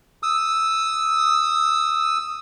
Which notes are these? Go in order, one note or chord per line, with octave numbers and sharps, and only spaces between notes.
D#6 E6